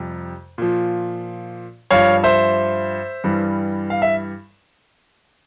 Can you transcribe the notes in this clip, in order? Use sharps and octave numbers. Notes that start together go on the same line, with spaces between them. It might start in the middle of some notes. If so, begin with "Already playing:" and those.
Already playing: F2 C3 G3
A#2 F3
G2 F3 C#5 F5
C5 E5
G2 E3 G3
F5
E5